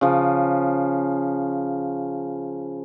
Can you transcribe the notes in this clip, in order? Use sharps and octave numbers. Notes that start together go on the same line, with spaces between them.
C#3 F3